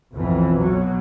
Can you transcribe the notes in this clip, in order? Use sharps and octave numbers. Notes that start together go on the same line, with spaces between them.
B1 F2 E3
B2 F#3